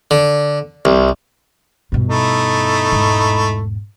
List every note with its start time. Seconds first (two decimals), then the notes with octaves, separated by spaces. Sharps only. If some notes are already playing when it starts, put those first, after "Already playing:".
0.11 D3
0.85 C2
1.92 G2 B2
2.09 A3 D#4 E4
2.92 E1 G#2